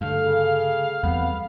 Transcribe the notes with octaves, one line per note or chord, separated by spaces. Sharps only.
G2 D3 A3 F5
C#3
E2 G3 B3 C4